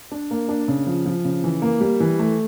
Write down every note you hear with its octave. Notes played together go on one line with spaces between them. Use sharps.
D4
A#3
D4
C#3
F3
F3
C#3
E3
A#3
G3
E3
A3